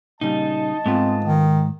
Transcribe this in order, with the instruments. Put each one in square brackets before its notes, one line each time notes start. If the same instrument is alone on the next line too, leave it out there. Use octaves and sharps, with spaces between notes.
[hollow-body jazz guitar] A#2 C#3 G3 [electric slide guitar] D#4 [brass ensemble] D#5 A5
[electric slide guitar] G#2 [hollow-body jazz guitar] A3 B3 F4 [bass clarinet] C4
[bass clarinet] D#3